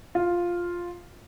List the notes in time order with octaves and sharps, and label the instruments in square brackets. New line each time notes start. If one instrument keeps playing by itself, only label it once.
[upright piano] F4